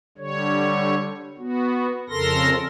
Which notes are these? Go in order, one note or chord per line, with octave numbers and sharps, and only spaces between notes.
D3 G3 C#5
B3 F#4
F2 C#3 A4 A#4 C6 A#6